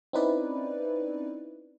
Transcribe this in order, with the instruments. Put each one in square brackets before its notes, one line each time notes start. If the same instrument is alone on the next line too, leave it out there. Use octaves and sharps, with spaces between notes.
[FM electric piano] C4 C#4 D#4 E4 B4 D5